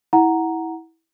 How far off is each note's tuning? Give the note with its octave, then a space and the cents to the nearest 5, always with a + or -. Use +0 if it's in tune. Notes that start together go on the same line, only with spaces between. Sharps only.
E4 -15 F#5 +0 A#5 +0